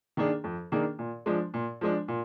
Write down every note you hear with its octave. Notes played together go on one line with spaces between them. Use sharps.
D#3 A#3 D4 G#4
F2
D#3 A#3 D4 G#4
A#2
F3 G#3 D4
A#2
F3 G#3 D4
A#2